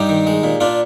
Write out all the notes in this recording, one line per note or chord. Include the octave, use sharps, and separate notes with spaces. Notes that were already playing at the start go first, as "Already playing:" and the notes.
Already playing: G2 D#4 G4
D#3
G#3
A#2
A#2 D4 F4